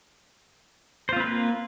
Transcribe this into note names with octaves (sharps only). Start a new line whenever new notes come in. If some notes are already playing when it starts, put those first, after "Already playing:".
A#3 C4 F4 B4 C5